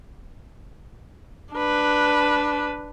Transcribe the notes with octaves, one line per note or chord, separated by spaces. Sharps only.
D4 B4